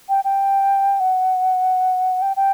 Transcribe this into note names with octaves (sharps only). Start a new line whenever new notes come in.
G5
G5
F#5
G5
G5